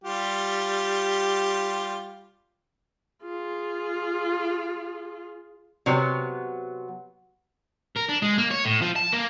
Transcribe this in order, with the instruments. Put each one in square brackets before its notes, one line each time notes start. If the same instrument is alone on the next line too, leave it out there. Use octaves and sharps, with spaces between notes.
[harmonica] G3 F4 G4
[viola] F4 G#4
[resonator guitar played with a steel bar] C3 F#3 B3
[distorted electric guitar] A#4
D4
G#3
A#3
C#5
A2
F3
A5
A#3